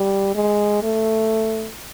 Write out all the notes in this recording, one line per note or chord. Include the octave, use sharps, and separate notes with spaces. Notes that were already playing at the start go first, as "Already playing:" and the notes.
Already playing: G3
G#3
A3